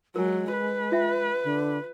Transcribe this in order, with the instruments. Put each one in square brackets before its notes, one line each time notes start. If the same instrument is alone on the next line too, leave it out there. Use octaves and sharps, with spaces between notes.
[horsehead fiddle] F#3 [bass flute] G#3 [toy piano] A#4 G#5
[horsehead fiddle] B4
[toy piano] F4 E5 G5
[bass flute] D3